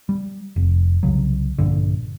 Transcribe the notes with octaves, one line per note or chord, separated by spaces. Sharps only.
G3
F1
C2 C#3 F#3
A#1 G2 D3